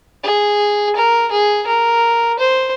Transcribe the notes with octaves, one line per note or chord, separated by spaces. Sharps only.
G#4
A#4
G#4
A#4
C5